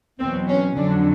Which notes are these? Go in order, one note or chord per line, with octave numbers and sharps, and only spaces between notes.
E2 B2 F#3 C4
C#4
F2 D3 F#3 D4